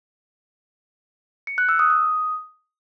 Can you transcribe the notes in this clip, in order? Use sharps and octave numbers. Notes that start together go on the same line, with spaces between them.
C#7
F#6
E6
D#6
D#6